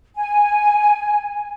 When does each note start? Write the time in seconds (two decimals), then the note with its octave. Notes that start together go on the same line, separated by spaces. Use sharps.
0.16 G#5